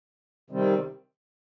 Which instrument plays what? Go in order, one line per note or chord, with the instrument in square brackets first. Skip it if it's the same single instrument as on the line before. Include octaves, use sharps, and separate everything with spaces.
[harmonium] C3 D#3 G3 C4